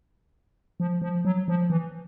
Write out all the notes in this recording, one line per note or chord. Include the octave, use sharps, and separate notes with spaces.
F3
F3
F#3
F3
E3